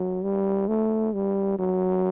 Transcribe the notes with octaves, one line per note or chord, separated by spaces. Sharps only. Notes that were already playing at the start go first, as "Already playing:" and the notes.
Already playing: F#3
G3
A3
G3
F#3